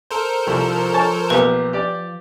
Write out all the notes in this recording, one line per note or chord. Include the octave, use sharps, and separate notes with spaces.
A4 A#4 C5
C2 F3
C#5 A5 C#6
B1 A#3 G4 B4
G4 D5